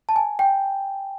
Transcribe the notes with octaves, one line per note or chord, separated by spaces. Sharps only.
A5
G#5
G5